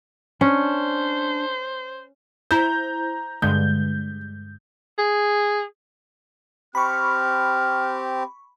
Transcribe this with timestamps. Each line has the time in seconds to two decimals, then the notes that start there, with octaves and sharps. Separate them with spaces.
0.41 C#4 D4 C5
2.51 E4 C5 A#5 G6
3.42 G2 D3 G#3 G6
4.98 G#4
6.75 C4 G4 B5 C#6 F6